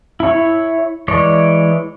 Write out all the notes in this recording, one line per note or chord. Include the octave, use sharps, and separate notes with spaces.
E4 C#5
E3 G#3 C#5 D5